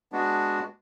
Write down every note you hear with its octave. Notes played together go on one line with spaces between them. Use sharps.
G#3 B3 D4 F#4